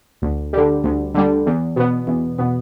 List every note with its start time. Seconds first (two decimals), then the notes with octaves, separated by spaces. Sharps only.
0.22 D2
0.53 D3 G3
0.84 D2
1.14 D3 G3
1.46 E2
1.76 B2 B3
2.07 E2
2.38 B2 B3